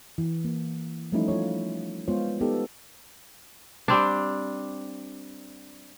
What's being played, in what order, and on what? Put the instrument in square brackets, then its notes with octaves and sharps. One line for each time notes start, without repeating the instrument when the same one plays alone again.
[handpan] E3
A#3
F3 G3 A3 C#4 D#4 E4
F4 C#5
G#3 B3 F4 C5 C#5
B3 D#4 G4 A4
[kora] G3 C4 D4